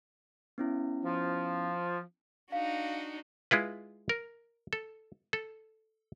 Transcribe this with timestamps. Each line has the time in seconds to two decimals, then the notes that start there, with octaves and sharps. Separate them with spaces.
0.58 B3 C#4 E4
1.05 F3
2.52 D4 D#4 F#4 F5
3.51 G#3 E4 F4 B4
4.09 A#4
4.73 A4
5.33 A4